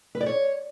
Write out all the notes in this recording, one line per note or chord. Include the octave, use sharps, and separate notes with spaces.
B4
D5
C#5